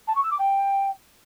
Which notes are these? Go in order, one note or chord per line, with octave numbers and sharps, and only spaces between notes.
A5
C#6
E6
D6
G5